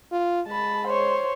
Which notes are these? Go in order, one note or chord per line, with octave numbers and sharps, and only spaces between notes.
F4
G#3 A5 B5
C5 C#5